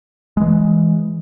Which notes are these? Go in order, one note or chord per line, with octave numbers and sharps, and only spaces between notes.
E3 G#3